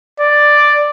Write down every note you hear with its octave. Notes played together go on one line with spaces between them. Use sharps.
D5